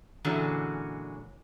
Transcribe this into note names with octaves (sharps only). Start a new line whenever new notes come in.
A#2 D3 E3 G#3 C#4 F#4